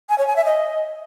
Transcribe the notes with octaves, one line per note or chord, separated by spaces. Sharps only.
G#5
C#5
G#5
E5
D#5